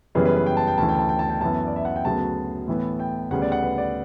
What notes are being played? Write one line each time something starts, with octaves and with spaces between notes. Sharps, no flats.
F#2 C#3 E3 G3 B3 B4
B4
B4
G5
A5
G5
D2 C#3 E3 A5
G5
A5
G5
A5
G5
F#2 E3 B3 A5
D5
E5
F#5
G5
D2 C#3 F#3 B3 A5
A2 E3 B3
G5
D2 C#3 G3 B3 F#5
D5
F#5
B4
D5